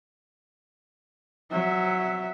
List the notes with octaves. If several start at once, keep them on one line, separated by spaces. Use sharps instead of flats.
F#3 E5